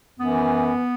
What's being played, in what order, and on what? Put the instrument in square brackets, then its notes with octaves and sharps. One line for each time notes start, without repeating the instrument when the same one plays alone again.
[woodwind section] F#2 E3 B3